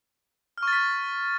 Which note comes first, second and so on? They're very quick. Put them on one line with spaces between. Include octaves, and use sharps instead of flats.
F6 C#6 A6 B6